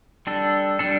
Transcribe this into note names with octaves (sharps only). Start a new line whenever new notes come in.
G3 D4 A4
G3 D4 A4